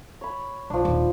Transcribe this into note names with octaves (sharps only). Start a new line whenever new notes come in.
C#5 B5
B1 F3 D4
D#1